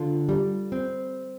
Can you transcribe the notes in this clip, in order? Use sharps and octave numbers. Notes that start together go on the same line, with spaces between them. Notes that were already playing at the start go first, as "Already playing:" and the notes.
Already playing: D3 F4
G3
C4